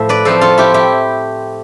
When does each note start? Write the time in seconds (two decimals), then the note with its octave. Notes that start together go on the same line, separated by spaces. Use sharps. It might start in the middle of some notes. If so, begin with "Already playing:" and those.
Already playing: A2 F3 A3 E5
0.09 B4 D5
0.25 A2 F3 A3 C4 A4 C5
0.41 F4 A4
0.58 E4 G4
0.74 E4 G4